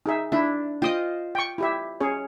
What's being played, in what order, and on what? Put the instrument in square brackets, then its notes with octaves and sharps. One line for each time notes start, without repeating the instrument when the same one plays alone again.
[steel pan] D#4 G#4 E5
[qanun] D4 [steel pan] E4 E5
[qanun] F4 C5 D#5 [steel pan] G5 D#6
[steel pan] G5 C#6
E4 G4 E5
C#4 G#4 C#5